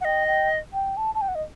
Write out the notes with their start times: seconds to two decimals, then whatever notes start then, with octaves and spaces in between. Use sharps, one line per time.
0.01 F#5
0.05 D#5 G5
0.27 G5
0.73 G5
0.97 A5
1.15 A5
1.21 G5
1.28 F#5
1.35 D#5